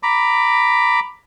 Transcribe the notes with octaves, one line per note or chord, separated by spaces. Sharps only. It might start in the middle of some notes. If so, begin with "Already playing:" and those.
A#5 B5 D6